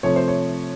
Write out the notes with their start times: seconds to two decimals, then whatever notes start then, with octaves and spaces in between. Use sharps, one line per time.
0.03 C3 F3 A3 C#5
0.16 C5
0.28 C#5